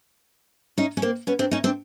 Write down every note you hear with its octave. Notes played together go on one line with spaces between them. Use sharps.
C#4 D#4
C#4
A#3 C4
B3 C#4
C4 D4
C#4 D#4
C4 D4